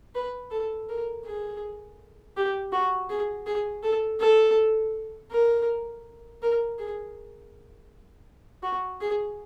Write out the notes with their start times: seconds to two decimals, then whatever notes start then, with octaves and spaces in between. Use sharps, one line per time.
0.15 B4
0.51 A4
0.89 A#4
1.26 G#4
2.37 G4
2.72 F#4
3.10 G#4
3.46 G#4
3.83 A4
4.20 A4
5.31 A#4
6.42 A#4
6.79 G#4
8.63 F#4
9.01 G#4